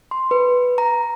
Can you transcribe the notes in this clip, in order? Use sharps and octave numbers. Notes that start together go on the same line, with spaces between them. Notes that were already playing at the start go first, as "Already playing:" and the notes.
C6
B4
A#5